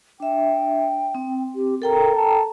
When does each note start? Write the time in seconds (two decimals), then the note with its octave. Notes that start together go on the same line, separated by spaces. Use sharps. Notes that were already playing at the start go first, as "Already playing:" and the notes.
0.20 D4 E5 G5
1.15 C4
1.55 G4
1.82 A4 A#4 G5 A#5
2.16 A5